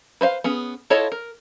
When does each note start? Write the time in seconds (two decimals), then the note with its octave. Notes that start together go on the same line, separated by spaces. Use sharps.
0.21 B4 C5 E5 F5
0.44 B3 C#4 G#4
0.90 E4 F4 A4 C#5 D#5
1.12 A#4